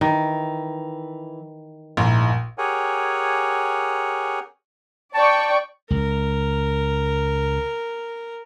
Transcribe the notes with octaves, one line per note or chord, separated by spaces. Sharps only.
D#3 E3
A#1 G#2 E4
G4 G#4 A#4 C#5 F#5 G#5
D5 G5 A5 C#6
C#2 A#4